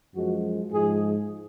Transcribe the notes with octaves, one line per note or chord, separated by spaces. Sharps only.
F#2 F3 G#3 F#4
G#2 F3 G#3 G#4